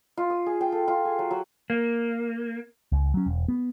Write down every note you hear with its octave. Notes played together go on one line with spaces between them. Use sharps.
F4
D#6
G#4
G5
A4
F4
G#4
F#3
F#3
A#3
C#2
F#3 C#4
E1
B3